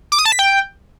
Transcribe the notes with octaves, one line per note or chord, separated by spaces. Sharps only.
D6
D#6
A5
B6
G5